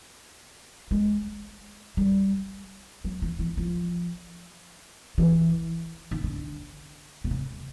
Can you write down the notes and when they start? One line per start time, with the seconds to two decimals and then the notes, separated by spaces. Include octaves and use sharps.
0.91 G#3
1.97 G3
3.04 F#3
3.22 E3
3.39 E3
3.57 F3
5.18 E3
6.11 D#3
6.24 D3
7.24 C3
7.31 C#3